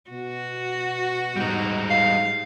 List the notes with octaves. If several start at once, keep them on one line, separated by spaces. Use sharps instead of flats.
B2 F#4
G#2 G3 D#4
F5